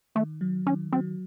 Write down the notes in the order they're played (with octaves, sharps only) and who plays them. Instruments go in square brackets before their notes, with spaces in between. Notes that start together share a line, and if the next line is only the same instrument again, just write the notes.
[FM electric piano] D#3 [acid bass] A3
[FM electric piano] F#3
[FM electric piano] D#3 [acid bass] C#4
[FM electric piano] F#3 [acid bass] C4